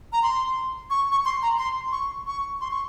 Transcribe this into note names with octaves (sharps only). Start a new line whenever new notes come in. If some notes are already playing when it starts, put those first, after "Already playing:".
A#5
C6
C#6
C#6
C6
A#5
C6
C#6
C#6
C6
C#6